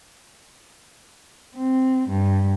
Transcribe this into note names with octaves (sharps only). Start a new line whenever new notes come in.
C4
G2